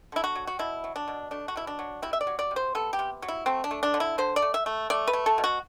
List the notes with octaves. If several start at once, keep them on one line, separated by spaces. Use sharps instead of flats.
D3 E4
F#4
F#3
F#4
B2 E4
F#3
D4
B2
A3 D4
F#4
B2 E4
D4
F#3
C3 E4
E5
D5
F#3
D5
C3
C5
B3 A4
G4
C3
F#3
E4
A3 C4
D4
A3
D4
D3
E4
D3 C5
D5
A3
E5
A3
A3 D5
B4
A3
A4
B2
F#4